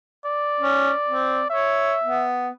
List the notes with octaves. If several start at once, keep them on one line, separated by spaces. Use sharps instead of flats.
D5
C#4
C4
C#5 E5
B3